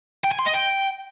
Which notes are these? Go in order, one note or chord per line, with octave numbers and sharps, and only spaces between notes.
G5
G#5
C6
D#5
G5